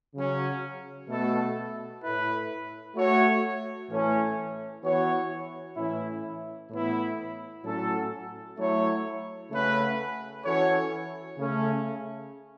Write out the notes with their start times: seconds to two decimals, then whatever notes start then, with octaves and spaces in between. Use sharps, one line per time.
0.15 C#3 F#3 C#4
1.08 B2 A3 F#4 A4
2.03 A2 A3 E4 B4
2.95 A3 F#4 C#5
3.89 A2 E3 A3 C#4
4.82 E3 B3 F#4 C#5
5.76 A2 E3 C#4 E4
6.69 A2 E3 B3 E4
7.64 A2 F#3 C#4 F#4 A4
8.58 F#3 A3 E4 C#5
9.50 C#3 A3 C#4 F#4 B4
10.45 E3 C#4 F#4 A4 C#5
11.38 C#3 A3 C#4